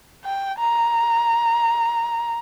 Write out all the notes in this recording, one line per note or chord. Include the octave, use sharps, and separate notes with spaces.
G5
A#5